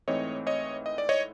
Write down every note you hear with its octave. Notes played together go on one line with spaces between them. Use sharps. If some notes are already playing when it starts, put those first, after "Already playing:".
G#2 E3 A3 C4 C#5 D#5
C#5 D#5
D#5
D5
C#5 D#5